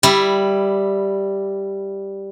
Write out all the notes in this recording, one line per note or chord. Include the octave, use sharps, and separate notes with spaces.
G3 E4